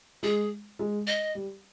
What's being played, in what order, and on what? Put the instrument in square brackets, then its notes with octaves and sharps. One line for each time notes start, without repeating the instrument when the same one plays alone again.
[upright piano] G#3 [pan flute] G#4
[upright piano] G#3
[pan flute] D#5
[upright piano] G3